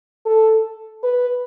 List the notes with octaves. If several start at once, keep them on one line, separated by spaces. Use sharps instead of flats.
A4
B4